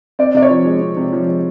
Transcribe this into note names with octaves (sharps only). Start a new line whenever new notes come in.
C4 D5
C3 D5
C#5
F3
G#3
C4
C3
F3
G#3